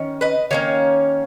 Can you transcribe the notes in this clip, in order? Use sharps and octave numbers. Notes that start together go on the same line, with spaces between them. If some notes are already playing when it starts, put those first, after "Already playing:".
Already playing: D#3 C#4
B4 D#5
D#3 A#3 C#4 C#5 F5